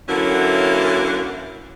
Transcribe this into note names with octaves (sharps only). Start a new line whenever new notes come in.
D3 E3 F#3 A#3 C#4 E4